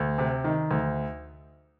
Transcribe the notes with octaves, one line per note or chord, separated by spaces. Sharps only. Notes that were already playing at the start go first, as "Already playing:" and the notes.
Already playing: D2
C3
D#3
D2